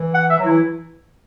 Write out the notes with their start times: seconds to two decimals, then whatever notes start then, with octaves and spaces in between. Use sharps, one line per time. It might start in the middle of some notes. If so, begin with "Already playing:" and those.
Already playing: E3
0.14 F#5
0.30 E5
0.39 F#3
0.45 E3 E4